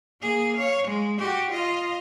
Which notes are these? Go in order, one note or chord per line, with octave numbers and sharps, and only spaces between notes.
A#3 G#4
C#5 F5
G#3
F#4 G4
F4 D#5